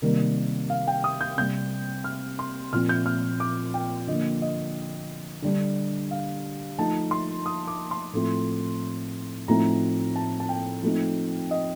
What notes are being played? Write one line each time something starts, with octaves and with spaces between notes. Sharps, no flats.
C3 D#3 G3 A#3 A#4
F5
G5
D#6
G6
C3 G3 C4 G6
F6
C6
A#2 F3 C4 F6
G6
F6
D6
G5
D3 F3 A#3 D#5
D#5
D3 G3 D4
F5
F3 A3 D#4 A5
C6
D#6
D6
C6
A2 F3 A3 C4
A2 F3 A3 C4 D#4 A#5
A5
A5
G5
F3 A3 C4 D#4
D#5